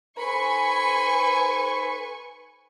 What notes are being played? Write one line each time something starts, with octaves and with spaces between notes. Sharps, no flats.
D#4 A4 B4 C5 G#5 B5 C#6